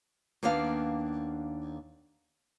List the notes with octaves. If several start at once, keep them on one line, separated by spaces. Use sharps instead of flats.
D#2 A#3 B3 D4 F5